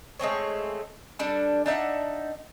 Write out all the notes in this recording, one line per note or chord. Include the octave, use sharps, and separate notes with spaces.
G#3 A3 C4 C#5
G3 D4 A4
D4 D#4 E5 F#5